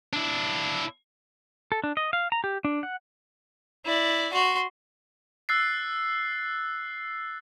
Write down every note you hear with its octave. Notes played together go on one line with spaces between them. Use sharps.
D4 E4
A4
D4
D#5
F5
A#5
G4
D4
F#5
E4 D5
F#4 C6
E6 F#6 A6 C7